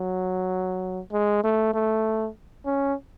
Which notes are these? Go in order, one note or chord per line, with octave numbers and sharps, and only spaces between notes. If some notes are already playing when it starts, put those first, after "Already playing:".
Already playing: F#3
G#3
A3
A3
C#4